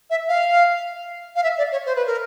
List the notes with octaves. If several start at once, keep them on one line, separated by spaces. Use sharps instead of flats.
E5
F5
F5
E5
D5
C#5
C5
B4
A#4